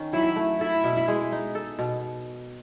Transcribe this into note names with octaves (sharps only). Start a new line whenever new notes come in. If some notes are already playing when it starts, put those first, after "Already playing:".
Already playing: D#3 C#4
F#3 E4
A3
E4 A4
B2
G#3
D#4
A4
B2